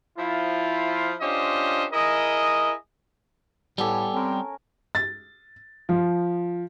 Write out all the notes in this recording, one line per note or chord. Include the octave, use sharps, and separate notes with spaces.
F3 E4 F4
C#4 D4 F4 G4 C5 D#5
E4 G#4 A#4 D#5
A2 G3 B3 G4 A4 G#5
C4 C#4 A#4
A6
F3